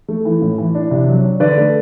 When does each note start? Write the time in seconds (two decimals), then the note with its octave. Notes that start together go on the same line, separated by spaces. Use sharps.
0.08 A3
0.25 E3
0.42 A2
0.58 E3
0.75 D4
0.91 C3
1.08 F#3
1.24 D4
1.40 D3 B4 D5
1.57 A3